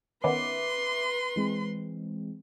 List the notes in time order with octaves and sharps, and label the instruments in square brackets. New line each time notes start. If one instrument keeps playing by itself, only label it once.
[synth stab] D#3 B3 C#4 [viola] B4 C6 [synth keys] E5 D6
[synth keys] E3 G#3 C4